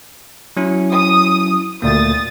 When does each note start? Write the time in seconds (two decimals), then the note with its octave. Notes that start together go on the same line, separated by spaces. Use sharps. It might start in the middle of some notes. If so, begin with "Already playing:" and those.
0.57 F#3 C#4 E4
0.92 D#6
1.82 D2 A#2 A#3 D#6 A6